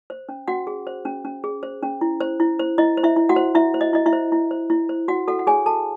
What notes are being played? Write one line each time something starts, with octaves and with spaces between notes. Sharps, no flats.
C5
C#4
C#4 F#4 F#5
G#4
C5
C#4
C#4
G#4
C5
C#4
E4
C5
E4
C5
E4 D#5
C5
E4 E5
E4
F#4 F#5
C5
E4 E5
C5
D#5
E4 D#5
E4 E5
C5
E4
C5
E4
C5
F#4 F#5
F#4 A4 F#5
F#5
G#4 C#5 G#5
F#4 A4 A5